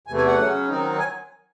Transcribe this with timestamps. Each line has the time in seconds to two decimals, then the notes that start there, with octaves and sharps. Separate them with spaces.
0.07 E2 C3 E3 A3 G#5
0.18 G#5
0.27 F#5
0.38 C#3 F#3 C#4
0.68 D#3 F#3 C4 D#4
0.99 G#5